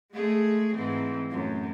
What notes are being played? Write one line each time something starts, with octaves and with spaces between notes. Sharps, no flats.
G#3 A3 G#4
G#2 E3 C4
F#2 A2